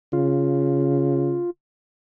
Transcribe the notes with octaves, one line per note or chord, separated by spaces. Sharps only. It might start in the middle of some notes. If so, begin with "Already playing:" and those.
C#3 F4